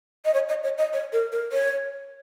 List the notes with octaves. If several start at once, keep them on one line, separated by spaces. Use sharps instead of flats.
D#5
C#5
D#5
C#5
D#5
C#5
A#4
A#4
C#5